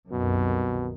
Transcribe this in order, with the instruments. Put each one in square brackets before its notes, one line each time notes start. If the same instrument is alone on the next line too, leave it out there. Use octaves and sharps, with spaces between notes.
[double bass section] C2 F#2 D#3 [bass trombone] B2